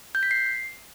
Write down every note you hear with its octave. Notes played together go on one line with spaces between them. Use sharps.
G6
B6
C7